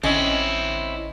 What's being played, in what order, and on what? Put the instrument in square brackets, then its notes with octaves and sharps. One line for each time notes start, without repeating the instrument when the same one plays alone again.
[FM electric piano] A1 D3 D#5 [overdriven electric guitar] C4 E4 [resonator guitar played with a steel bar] C#4